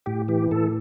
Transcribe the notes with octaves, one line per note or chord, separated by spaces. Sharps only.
A2 G4
E3 G4
A2 A4